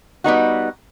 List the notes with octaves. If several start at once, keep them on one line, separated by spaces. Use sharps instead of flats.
G3 B3 D#4 F#4